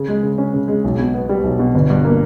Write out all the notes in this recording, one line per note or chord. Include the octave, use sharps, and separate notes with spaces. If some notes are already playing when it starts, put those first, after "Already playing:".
Already playing: C#3
G#3
C#3
C#4
C#3
G#3
B1
B2
B3
G3
B1
B2
G1
G2
A#3